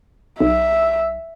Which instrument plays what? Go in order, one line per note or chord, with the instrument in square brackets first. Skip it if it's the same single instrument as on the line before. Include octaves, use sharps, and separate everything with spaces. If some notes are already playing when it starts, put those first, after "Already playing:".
[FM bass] B1 [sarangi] E5